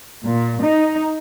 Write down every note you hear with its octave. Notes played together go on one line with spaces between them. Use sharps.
A#2
D#4